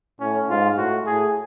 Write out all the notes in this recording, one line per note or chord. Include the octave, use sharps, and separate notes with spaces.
A2 C#4
G#2 F4
A2 F#4
A2 G#4